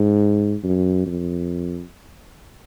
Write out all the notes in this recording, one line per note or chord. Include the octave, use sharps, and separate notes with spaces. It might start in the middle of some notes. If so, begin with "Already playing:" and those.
Already playing: G#2
F#2
F2